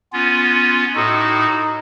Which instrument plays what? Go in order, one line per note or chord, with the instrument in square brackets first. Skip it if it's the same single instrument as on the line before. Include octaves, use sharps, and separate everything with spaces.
[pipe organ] B3 C#4 F4
[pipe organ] A2 F#4 A4 [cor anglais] D#4